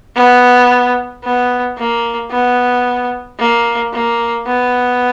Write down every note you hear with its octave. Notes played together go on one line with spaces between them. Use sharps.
B3
B3
A#3
B3
A#3
A#3
B3